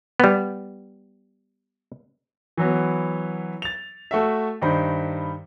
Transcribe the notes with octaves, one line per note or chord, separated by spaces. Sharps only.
G3 B3
E3 F#3 B3
A6 F7
A3 F#4 E5
G2 D#3 C5 B5